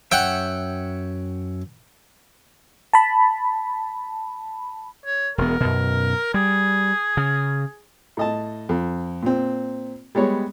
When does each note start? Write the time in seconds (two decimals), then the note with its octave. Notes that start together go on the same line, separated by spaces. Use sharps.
0.12 F#2 C#5 E5 F#5 G5
2.93 A5 B5
5.05 C#5
5.38 E1 B3 A#4
5.60 F#2 B2
6.34 G3 G#4
7.17 C#3
8.17 A2 D#5 A5
8.69 F2
9.23 A#2 C4
10.15 G3 G#3 B3 C#5